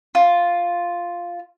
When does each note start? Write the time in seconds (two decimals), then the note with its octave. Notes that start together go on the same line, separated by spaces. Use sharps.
0.15 F4